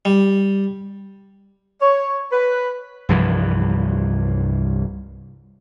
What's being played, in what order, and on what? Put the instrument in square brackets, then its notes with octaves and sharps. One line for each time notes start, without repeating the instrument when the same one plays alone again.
[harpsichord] G3
[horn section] C#5
B4
[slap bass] C2 G2 E3 F3